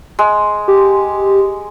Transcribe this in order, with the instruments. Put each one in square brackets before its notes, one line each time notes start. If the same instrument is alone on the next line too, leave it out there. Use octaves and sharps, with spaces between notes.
[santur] G#3
[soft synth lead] G4